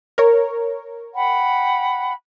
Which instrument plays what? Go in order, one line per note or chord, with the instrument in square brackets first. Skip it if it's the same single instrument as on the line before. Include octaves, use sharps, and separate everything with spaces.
[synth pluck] A#4 C#5
[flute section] F#5 G5 B5